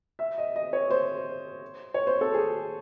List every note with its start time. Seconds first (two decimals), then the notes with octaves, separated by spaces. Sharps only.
0.19 E5
0.38 D#5
0.56 D#5
0.73 C#5
0.91 C5
1.94 C#5
2.07 C5
2.21 A4
2.34 G#4